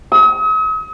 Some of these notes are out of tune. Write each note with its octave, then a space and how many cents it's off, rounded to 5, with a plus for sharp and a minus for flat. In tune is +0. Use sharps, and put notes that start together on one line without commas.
D#6 +45